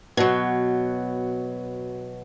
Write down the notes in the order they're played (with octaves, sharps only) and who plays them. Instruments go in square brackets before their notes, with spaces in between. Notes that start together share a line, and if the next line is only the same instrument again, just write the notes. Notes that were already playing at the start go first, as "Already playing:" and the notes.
[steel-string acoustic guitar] B2 F#3